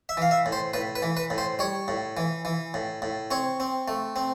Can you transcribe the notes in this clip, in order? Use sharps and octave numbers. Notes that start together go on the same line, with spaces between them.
E5
E3 F5
E5
A2
C5
A2 B4
B4
E3
B4
A2
C5
G3 C#5
A2
E3
E3
A2
A2
C4 C#5
C4
A3
C4